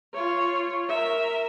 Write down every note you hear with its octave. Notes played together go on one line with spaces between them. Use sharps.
F4 C#5
A#4 E5